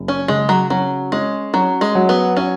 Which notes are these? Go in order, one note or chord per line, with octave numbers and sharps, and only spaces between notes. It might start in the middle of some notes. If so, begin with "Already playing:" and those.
Already playing: F#1
C#4
C#3 G#3
F#3
F#3 C#4
G#3 C#4
F#3 C#4
G#3
F#3
B3
C#4 F#4